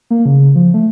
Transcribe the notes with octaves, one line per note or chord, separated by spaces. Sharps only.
A#3
C#3
F3
A3